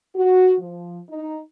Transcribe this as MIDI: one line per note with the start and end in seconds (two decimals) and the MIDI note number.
0.16 0.55 66
0.61 0.99 53
1.09 1.40 63